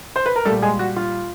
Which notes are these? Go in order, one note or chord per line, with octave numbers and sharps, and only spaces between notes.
C5
B4
A#4
A#2 G3 A3 A4
G#3 G#4
F#4
F4